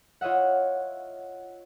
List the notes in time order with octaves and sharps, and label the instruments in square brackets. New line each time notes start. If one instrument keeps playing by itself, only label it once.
[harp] F4 C#5 D#5 E5 F#5